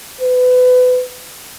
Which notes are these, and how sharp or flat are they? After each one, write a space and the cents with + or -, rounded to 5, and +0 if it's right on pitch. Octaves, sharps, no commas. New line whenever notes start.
B4 +30